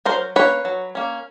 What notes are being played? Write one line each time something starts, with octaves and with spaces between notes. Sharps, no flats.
F#3 A#4 C5
A#3 C#4 B4 C#5
F#3
A#3 C#4